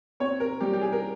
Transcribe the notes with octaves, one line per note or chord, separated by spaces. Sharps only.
C4 C#5
A#4
G3 G4
G4
G#4
A#4